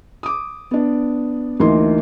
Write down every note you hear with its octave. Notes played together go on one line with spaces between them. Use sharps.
D6 D#6
B3 D4
D2 E3 A#3 D#4 C6